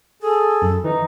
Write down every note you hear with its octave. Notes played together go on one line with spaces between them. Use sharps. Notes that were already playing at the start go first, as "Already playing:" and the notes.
G#4 A4
F#2
E3 D#4